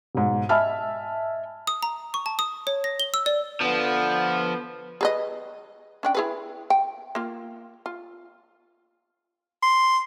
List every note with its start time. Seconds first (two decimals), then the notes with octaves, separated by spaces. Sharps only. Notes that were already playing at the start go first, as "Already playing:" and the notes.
0.15 B1 G#2
0.49 D#5 E5 G#5 A5 B5 F6
1.67 D#6
1.83 A#5
2.14 C#6
2.26 A5
2.39 D#6
2.67 C#5
2.84 A#6
3.00 G7
3.14 E6
3.26 D5
3.61 D3 F3 B3
5.01 G#4 B4 D#5
6.03 C#4 D4 G5
6.15 E4 G#4 B4
6.70 G5
7.15 A#3 F4
7.86 F4
9.63 C6